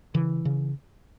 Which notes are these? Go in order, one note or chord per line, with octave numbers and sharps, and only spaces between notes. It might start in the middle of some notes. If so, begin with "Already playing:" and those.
C#3 E3
C#3